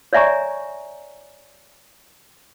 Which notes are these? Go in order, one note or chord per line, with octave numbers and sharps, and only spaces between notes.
C#5 D5 E5 G#5 A#5 C#6